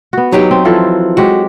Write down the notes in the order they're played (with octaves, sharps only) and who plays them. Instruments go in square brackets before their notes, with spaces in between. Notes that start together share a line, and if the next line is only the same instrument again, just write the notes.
[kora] B3 F#4
[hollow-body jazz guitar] F#3 D#4 G4
[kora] C4
E3 F3 A4
[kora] F#3 G#3 G4 [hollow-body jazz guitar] F#4